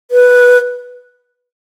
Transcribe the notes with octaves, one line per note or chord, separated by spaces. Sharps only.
B4